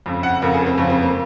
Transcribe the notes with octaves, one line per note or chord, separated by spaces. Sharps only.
F2 C#3
F#5
F2 C#3 A#4
G#4
C4
F2 C#3 C#4
C4
A#3